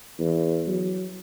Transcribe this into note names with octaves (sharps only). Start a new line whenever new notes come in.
E2
F#3